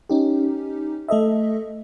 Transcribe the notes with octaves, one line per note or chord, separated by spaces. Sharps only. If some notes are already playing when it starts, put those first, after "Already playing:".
C#4 D#4 G4
A3 A4 D#5 E5